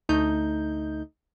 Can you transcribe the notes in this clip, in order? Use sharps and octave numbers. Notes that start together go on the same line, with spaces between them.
D2 A3 D#4 G6